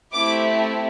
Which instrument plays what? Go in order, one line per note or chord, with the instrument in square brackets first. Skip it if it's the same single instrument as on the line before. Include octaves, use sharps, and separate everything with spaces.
[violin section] A3 C4 E4 G4 D6